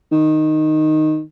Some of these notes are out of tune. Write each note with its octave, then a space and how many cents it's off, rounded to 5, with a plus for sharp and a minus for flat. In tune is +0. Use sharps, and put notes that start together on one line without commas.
D#3 -5